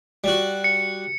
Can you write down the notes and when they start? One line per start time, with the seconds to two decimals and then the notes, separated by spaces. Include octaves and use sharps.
0.24 G3 F#4
0.64 C#7